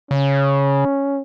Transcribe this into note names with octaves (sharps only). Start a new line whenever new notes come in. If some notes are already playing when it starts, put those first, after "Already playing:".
C#3 C#4